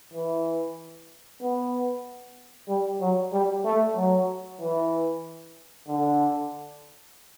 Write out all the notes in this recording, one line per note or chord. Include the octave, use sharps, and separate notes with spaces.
E3
B3
G3
F#3
G3
A3
F#3
E3
D3